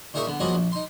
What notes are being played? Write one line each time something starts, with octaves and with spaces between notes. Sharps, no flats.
A#2 D#4 G#4 A#4 E5 C#6
D3 B3
F3 F#3 A#3 B3 G#4 D#5
A#1
D#4 C6